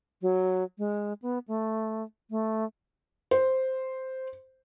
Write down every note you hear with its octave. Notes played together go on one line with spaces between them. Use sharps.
F#3
G#3
B3
A3
A3
C5